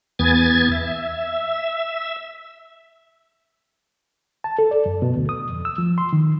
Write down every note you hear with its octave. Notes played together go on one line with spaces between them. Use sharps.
E2 B3 G#5 G#6 A6
E5
A5
A4
D5
F#2
B2
D2
D#6
F2
E6
F3
C6
D#3